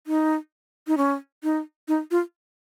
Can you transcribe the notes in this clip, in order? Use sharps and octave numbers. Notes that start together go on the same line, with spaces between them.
D#4
D#4
C#4
D#4
D#4
F4